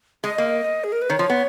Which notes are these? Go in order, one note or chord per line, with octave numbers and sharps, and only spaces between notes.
G#3 D#5
A#3
G#4
A#4
B4
D#3 C#5
F3
B3